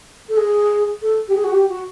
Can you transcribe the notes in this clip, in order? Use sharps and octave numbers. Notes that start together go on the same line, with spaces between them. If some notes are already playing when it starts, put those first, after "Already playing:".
A4
G#4
A4
G4
G#4
F#4
G4
F#4